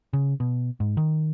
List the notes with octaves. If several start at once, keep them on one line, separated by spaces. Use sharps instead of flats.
C#3
B2
G#2
D#3